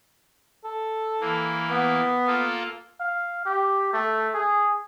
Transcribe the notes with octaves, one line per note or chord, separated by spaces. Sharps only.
A4
E3 A#3
B3
A#3 F4 A4
F5
G4
A3
G#4